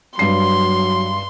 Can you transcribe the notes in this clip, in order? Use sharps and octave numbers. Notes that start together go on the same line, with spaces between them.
G2 F#3 C6 C7